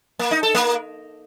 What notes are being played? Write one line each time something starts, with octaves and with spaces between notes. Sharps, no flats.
A#3
D#4
A4
A#3